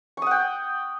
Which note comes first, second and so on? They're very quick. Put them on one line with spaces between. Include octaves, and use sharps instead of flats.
C#6 D#6 F#5 G5